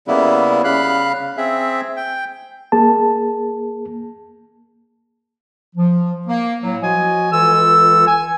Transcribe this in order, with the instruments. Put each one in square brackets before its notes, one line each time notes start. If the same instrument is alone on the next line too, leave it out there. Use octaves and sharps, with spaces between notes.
[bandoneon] C#3 G3 A#3 B3 E4
C#3 F5 B5 F#6
C4 G#4 E5
G5
[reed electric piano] A#3 G#4 A5
[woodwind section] F3
A#3
A2 F#3
F3 F#4 D#5 G#5
C#2 E3 F4 A4 E6
G#5